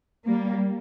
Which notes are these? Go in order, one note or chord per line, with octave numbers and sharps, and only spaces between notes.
G3 A#3